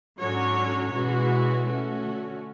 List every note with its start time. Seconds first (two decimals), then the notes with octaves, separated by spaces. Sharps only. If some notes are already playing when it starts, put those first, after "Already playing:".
0.20 G#2 D3 F#3 C#4 F#4 C#5
0.93 B2 E3 G#3 C#4 F#4
1.65 A3 C#4 F#4
2.02 D3